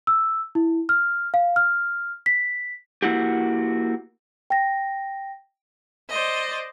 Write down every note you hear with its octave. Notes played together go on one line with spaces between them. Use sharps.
E6
E4
F6
F5
F6
B6
A#3 E4 F#4 G4
G5 A#6
C5 D5 D#5